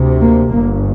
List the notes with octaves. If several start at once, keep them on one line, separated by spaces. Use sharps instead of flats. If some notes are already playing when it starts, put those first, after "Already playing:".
Already playing: D2 C3
A#3
G1 G2 A#3